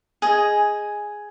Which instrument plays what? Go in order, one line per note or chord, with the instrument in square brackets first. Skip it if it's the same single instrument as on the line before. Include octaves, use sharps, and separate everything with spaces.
[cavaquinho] G#4 D#5 G#5